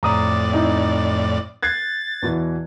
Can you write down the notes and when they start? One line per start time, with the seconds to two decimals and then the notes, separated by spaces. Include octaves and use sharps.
0.03 F2 A2 D5 A#5 D6 D#6
0.52 C4 D#4 E4
1.63 F#6 G#6 A6 C7
2.22 E2 B2 E3